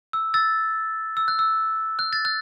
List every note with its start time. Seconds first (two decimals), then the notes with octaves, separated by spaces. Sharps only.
0.13 E6
0.34 E6 A6
1.17 E6
1.28 F#6
1.39 E6
1.99 F#6
2.13 A6
2.25 F#6